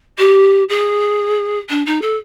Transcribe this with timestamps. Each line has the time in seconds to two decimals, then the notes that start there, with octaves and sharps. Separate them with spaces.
0.18 G4
0.69 G#4
1.69 D4
1.86 D#4
2.01 A4